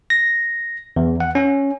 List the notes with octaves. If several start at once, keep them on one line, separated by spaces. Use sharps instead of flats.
A#6
E2
F#5
C#4